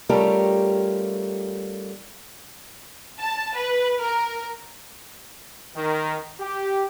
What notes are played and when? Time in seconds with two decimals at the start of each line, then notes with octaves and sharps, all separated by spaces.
0.09 G3 A3 C#4 F4 G4 A#4
3.21 A5
3.55 B4
4.01 A#4
5.76 D#3
6.40 G4